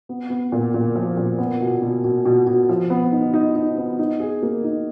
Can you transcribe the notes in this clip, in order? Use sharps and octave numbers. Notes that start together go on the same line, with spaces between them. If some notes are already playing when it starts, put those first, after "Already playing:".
B3
B3
A#2
A#2
F3
A#2
B3
B2
B2
B2
B2
B2
F3
B3
D#4
D#4
D#4
B3
D#4
G#4
A#3
D#4